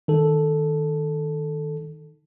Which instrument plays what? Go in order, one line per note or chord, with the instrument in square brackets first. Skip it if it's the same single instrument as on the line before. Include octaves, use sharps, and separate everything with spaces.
[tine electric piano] D#3 A4